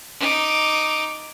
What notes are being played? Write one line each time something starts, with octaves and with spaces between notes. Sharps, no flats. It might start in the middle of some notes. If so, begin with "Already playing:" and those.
D#4 D6